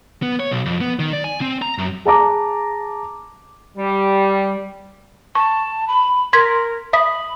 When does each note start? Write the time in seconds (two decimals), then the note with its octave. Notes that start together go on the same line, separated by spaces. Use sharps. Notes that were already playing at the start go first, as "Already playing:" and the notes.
0.22 B3
0.40 C#5
0.51 B1
0.66 F2
0.81 B3
0.99 D#3
1.13 D5
1.24 G#5
1.41 C4
1.62 A#5
1.78 F#2
2.05 G#4 A5 A#5 D6
3.77 G3
5.35 A5 C#6
5.88 B5
6.33 A#4 C6 G#6 B6
6.93 E5 B5 D#6 B6